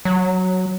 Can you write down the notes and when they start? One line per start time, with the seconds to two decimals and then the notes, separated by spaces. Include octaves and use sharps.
0.05 F#3